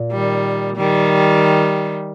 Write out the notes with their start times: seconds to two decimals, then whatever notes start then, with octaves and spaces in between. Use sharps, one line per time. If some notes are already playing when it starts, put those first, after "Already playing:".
Already playing: A#2
0.12 D#3 G3
0.77 D#3 G3